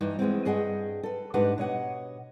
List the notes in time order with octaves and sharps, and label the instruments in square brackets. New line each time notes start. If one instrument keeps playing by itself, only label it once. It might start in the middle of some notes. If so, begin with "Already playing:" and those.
[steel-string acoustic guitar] G2 E3 D#4
E2 G#3 B3 C4
G2 G#4 D#5 F#5 G5
A4 B4
G#2 D4 G4 B4 D#5 F#5
B2 C#5 D#5 F#5